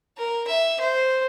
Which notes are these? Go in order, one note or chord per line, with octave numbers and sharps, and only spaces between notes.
A#4
E5
C5